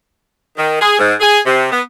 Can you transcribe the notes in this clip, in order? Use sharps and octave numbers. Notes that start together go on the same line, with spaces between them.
D#3
G#4
G#2
G#4
C3
B3